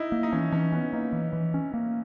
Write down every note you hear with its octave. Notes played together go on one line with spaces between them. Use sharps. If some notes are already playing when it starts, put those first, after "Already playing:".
Already playing: D#4 E4
A#3
D#4
E3 C#4
E3 C#4
B3 C#4
A#3 D#4
E3
E3
C#4
A#3